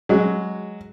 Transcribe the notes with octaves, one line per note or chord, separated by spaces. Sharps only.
F#3 G#3